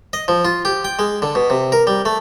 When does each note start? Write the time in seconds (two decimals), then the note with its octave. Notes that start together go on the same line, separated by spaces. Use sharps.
0.13 D#5
0.28 F3
0.45 F4
0.65 G4
0.85 G5
0.99 G#3
1.22 D3
1.35 B2
1.50 C3
1.72 A#4
1.87 G3
2.05 A3